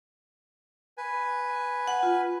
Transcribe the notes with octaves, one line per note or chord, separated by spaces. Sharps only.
B4 G#5
F#5
F4